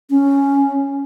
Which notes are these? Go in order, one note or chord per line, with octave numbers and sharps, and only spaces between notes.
C#4